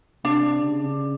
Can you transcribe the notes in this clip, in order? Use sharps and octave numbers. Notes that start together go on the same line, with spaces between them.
C3 D4
C#3